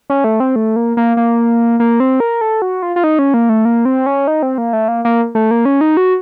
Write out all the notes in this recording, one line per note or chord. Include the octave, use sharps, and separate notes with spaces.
C#4
A3
C4
A3
A#3
A#3
A#3
A#3
C4
A#4
A4
F#4
F4
F4
D#4
C#4
A#3
A3
A#3
C4
C#4
D#4
C4
A#3
A3
A#3
A#3
A3
A#3
C#4
D#4
F#4